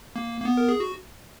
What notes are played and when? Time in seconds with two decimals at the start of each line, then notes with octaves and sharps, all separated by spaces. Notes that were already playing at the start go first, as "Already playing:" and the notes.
0.16 A#3
0.41 A#3
0.45 B3
0.57 A#4
0.69 G#4
0.80 F#4